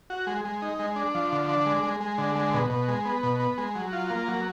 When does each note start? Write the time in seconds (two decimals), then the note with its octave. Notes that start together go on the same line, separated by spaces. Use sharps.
0.10 F#4
0.27 G#3
0.45 G#3
0.62 D#4
0.79 G#3
0.96 D4
1.14 F3
1.32 D3
1.49 D4
1.66 G#3
1.83 G#3
2.00 G#3
2.18 D3
2.35 G#3
2.53 B2
2.70 B2
2.88 G#3
3.05 B3
3.23 B2
3.40 B3
3.58 G#3
3.75 F#3
3.93 F4
4.10 A#3
4.28 F#3